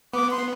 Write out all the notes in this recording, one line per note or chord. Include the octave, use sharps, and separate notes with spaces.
B3 D6
C6